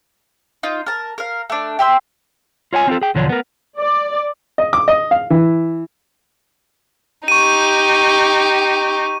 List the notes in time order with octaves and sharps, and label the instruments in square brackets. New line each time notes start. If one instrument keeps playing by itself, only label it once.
[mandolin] D#4 F4
A#4 A5
A#4 F5
A3 D4
G4 E5 C6 E6
[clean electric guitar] F4 C#5 F#5 G#5
C4 F4 A4
G#4 G5
B1 E2 D3 F3 D4 C#5
B3 A#4
[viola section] D5
[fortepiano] D#5
D6
D#5
F5
E3
[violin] D#4 G4 [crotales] C#6 D#7